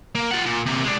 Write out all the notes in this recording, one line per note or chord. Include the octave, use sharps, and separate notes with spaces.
A#3
F4 F#5
A#2
C3 A#3
G#3 D4